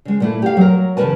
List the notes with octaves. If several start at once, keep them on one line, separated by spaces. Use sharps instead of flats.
C#3 G#3
A#2 A3 E4
G4 F5
F#3 A#4
C#3 E3 F#3 A#4 B4 A5